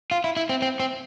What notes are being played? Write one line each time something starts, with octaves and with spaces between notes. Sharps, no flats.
F4
E4
E4
C4
C4
C4